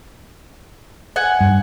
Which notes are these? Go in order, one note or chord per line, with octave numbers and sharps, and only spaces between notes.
F#5 G#5
G2